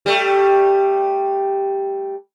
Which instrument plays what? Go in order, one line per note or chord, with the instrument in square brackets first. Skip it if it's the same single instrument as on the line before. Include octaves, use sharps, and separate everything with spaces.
[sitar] G3 A3